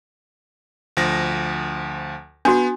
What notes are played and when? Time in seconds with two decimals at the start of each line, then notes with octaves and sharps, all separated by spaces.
0.97 D2 F3 A#6
2.45 B3 D4 F#4